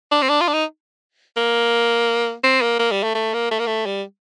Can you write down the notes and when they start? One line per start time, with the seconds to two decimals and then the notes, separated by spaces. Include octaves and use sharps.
0.11 D4
0.22 C4
0.29 D4
0.41 F4
0.48 D4
0.54 D#4
1.37 A#3
2.44 C4
2.62 A#3
2.79 A#3
2.91 G3
3.03 A3
3.15 A3
3.34 A#3
3.51 A3
3.59 A#3
3.67 A3
3.86 G3